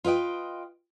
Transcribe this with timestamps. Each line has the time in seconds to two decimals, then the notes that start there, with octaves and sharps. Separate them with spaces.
0.04 F4 B4 D#5 G5